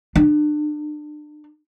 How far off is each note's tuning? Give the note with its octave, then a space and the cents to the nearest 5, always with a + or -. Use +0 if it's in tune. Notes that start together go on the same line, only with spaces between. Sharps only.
D4 +35